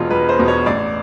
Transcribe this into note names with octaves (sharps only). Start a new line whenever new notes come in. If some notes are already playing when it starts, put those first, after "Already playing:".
Already playing: E1 E2 B2 F4
E1 B4
C5
E2 B2
C#5
A1 D5